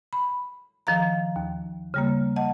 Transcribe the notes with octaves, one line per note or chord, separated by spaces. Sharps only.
B5
D#3 F3 F5 A#5
D#2
C#3 G3 A#3
D#5 F#5 A5